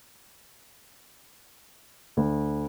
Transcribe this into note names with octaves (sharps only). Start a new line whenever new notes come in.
D2